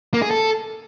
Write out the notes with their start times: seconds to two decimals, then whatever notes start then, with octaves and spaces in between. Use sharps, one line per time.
0.14 A#3
0.22 G#4
0.31 A4